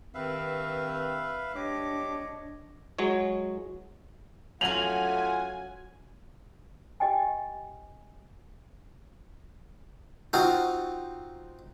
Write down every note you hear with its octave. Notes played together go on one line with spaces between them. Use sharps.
G2 D#3 C4 B4 E5 F5
D4 G4 C#5 D#5 D6
F#3 G#3 C#5
F#3 A3 C#4 F4 F#5 G#5 F7 F#7
G4 D#5 G5 G#5
C4 D#4 F4 F#4 C5 F5